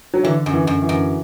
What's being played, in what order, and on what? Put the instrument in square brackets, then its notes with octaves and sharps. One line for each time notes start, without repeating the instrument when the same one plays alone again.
[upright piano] F#3
[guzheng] D3 [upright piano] E3
[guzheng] F#2
[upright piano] E3
[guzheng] F#2
[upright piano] E3
[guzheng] F#2